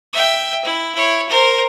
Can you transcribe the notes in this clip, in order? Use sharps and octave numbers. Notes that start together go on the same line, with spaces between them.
E5 G5
E4
E4 C#5
A#4 C5